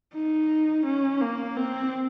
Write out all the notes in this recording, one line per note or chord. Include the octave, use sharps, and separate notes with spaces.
D#4
C#4
A#3
C4